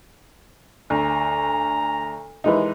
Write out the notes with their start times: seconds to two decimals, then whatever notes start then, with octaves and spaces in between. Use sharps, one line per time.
0.90 D2 G#5 A#5
2.44 D#2 C3 E3 G#3 D#4